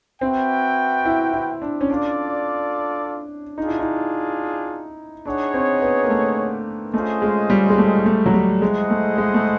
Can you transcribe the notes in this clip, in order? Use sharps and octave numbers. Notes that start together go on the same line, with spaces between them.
C4 F#4 B4 E5 G5
E4
E4
D4
C#4
D4 F4 A4 D5
D4 D#4 F4 G#4
E4
D#4
D4 D#4 G#4 C#5 F#5
C4
B3
A#3
A3
A3 C#4 F4 G#4 C5 D#5
G#3
G3
G#3
A3
A3
F#3
G3
G#3 E4 G#4 C5 D#5 F#5
A3
G#3
A3